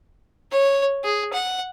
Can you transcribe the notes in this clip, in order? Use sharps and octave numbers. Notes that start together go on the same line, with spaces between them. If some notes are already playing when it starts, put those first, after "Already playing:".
C#5
G#4
F#5